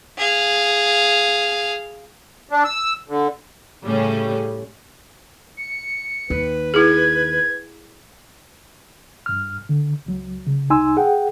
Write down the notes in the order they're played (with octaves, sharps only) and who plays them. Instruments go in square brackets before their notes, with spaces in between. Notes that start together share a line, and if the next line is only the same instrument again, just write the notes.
[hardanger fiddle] G#4 F5
[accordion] D4
E6
D3
[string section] A2 C#3 G3 A3 C#4
[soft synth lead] C#7
[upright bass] D#2 [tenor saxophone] B4
[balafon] E4 G#4 [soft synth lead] G#6
[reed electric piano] G2 F6
D3
C#2 F#3
C#3
C2 D#4 G#5 C6 E6
G#4 F#5 G5